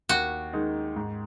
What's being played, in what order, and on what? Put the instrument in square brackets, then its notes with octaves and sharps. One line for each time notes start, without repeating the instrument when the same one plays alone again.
[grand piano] D#2 [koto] F#4
[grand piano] D#3 G#3 D#4
G#2